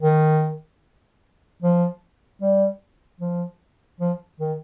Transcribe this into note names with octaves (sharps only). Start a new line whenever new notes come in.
D#3
F3
G3
F3
F3
D#3